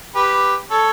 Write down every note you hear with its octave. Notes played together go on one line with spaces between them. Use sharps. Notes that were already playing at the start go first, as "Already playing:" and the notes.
G4 B4
A4 C#5